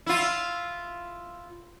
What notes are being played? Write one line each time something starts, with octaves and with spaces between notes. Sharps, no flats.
E4 F4